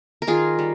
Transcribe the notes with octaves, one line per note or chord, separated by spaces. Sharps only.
A#4
D#3 F4 G#4
G3